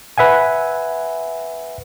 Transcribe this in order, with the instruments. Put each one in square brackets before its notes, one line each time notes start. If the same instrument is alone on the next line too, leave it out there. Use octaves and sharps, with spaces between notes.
[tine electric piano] B4 E5 F#5 G#5